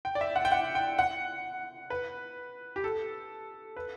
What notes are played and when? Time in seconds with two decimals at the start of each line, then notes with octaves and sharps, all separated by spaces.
0.05 G5
0.15 D5
0.21 E5
0.36 F#5
0.45 G5
0.52 F#5
0.75 G5
0.99 F#5
1.90 B4
2.76 G4
2.84 A4
3.77 B4